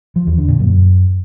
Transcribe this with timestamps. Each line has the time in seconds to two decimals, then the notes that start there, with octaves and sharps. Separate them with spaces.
0.16 F3
0.27 E2
0.38 D3
0.49 A#2
0.60 F#2